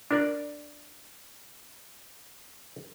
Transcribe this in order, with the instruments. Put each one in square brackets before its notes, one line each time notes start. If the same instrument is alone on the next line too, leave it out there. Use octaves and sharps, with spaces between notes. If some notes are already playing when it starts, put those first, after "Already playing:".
[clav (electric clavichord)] D4 A#4 D5